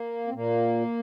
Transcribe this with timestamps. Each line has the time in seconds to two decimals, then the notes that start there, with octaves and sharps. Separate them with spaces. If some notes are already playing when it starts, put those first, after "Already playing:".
Already playing: A#3
0.27 C4
0.34 A#2 A#3